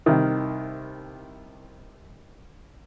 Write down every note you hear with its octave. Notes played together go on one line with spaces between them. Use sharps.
C2 D#3